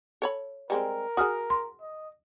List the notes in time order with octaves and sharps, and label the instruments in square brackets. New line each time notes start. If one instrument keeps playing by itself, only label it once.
[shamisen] A4 C#5 B5
[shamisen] G3 G#3 C4 [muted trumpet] A#4
[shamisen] F#4 G#4 [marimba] D#6 F6
[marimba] C6
[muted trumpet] D#5